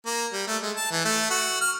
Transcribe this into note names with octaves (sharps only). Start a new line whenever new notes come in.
A#3
G3
A3
G#3
A5
E3
A3
F#4
F6